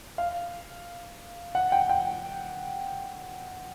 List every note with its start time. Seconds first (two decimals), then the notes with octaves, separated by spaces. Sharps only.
0.18 F5
1.55 F#5
1.72 G5
1.89 G5